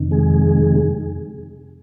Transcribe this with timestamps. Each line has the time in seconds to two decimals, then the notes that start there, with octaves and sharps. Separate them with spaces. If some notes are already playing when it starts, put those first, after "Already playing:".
Already playing: F2 C3 D#3
0.11 G#3 G#4